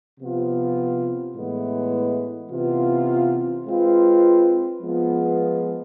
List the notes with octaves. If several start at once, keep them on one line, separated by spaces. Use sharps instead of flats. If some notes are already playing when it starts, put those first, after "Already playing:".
C3 F3 B3 F4
A2 E3 G#3 B3 E4
C3 E3 B3 F4
G#3 C4 F4 B4
F3 G#3 B3 F4